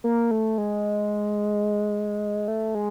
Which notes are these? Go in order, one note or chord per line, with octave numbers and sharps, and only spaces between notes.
A#3
A3
G#3
A3
G#3